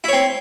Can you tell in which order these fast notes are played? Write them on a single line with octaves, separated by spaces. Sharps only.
E4 C#5 C4